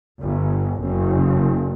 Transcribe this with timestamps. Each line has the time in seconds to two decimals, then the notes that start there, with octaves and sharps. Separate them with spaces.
0.22 G1
0.81 F#1